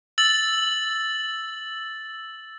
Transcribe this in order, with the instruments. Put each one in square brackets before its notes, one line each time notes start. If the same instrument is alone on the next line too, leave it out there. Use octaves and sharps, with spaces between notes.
[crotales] E6 A6 F#7